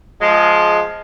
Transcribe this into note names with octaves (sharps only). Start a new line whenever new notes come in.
F3 G#3